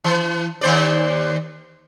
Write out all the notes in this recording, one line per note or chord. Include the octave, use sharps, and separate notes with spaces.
E3
D#2 C5 D5